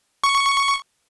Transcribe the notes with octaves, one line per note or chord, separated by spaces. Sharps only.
C#6